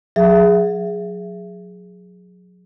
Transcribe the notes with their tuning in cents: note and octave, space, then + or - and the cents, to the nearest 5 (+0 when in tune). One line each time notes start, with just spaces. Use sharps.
F#3 -30 G#4 +0 E5 +20